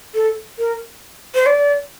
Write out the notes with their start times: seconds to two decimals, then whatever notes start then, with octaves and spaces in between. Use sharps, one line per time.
0.15 A4
0.59 A#4
1.35 C5
1.46 D5